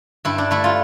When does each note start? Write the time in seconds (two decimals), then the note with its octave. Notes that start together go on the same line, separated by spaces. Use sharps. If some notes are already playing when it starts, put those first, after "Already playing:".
0.25 G2 E4
0.38 D4
0.51 A3 E4
0.64 F4